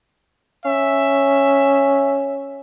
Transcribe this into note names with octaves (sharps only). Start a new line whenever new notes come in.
C#4 E5